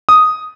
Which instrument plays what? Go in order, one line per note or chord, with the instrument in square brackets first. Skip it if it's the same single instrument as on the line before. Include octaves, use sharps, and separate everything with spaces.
[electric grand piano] D#6